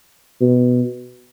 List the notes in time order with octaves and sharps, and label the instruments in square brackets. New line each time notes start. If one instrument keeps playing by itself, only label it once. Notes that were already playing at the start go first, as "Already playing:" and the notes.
[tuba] B2